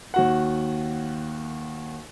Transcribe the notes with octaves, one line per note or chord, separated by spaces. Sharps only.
D#2 F#4 F#5